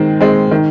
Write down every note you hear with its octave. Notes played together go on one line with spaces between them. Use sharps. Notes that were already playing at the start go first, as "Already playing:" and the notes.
Already playing: D#3 G#3 C4
G#3 C4
D#3